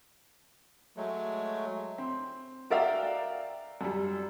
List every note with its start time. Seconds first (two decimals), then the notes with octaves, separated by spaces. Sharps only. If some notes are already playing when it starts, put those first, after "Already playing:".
0.97 F#3 G#3 A3
1.98 C4
2.70 F#4 A#4 D5 E5 F5 G5
3.81 F#2 G3